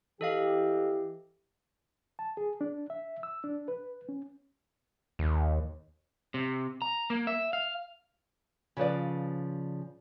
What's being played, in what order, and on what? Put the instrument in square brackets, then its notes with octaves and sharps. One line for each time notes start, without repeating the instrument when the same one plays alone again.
[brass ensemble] E3 G4 [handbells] A4 D#5 F5
[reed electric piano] A5
G#4
D4
E5
E6
D4
B4
C#4
[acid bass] D#2
[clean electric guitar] C3
A#5
A#3
E5
F5
[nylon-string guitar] C#3 F3 B4 D5